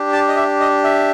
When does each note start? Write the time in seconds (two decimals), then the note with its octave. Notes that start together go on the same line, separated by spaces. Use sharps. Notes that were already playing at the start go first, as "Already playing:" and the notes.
Already playing: D4 G4
0.13 A5
0.28 D#5
0.37 E5
0.60 D#5
0.84 E5